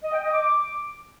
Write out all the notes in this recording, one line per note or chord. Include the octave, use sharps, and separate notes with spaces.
D#5
G5
D#5
D6